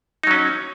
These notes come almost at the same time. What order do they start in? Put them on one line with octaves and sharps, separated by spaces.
D#4 F#3 C#4